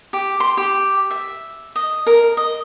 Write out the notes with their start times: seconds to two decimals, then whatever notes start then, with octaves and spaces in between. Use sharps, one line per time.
0.13 G4
0.40 C6
0.57 G4
1.11 E5
1.76 D#5
2.07 A#4
2.37 D#5